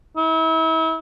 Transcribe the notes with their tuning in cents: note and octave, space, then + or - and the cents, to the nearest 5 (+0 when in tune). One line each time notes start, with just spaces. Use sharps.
E4 -35